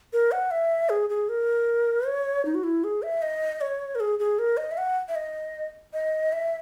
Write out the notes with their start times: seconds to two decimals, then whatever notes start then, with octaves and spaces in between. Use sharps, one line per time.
0.13 A#4
0.32 F#5
0.51 E5
0.89 G#4
1.10 G#4
1.29 A#4
2.07 C#5
2.45 D#4
2.55 F#4
2.64 E4
2.84 G#4
3.03 E5
3.22 D#5
3.61 C#5
3.95 A#4
4.00 G#4
4.19 G#4
4.39 A#4
4.57 D#5
4.71 E5
4.78 F#5
5.09 E5
5.15 D#5
5.93 D#5
6.32 E5